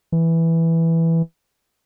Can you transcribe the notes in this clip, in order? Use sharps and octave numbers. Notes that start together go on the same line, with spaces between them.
E3